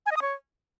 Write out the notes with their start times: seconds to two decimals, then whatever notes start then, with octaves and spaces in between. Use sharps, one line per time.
0.06 G#5
0.11 D#5
0.16 D#6
0.22 C#5